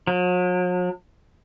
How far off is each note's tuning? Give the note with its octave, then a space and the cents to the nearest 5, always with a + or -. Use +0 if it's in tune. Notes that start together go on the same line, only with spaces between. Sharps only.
F#3 -45